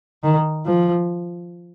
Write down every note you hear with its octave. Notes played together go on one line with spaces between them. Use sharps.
D#3
F3